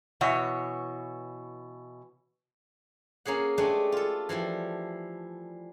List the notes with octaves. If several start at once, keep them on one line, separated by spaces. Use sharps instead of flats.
B2 E3 C#5 F#5
A#3 C#4 G#4 F#5
G#3 A3 D4 G4 B4 C#5
F4 A4
E3 F3 G3 E4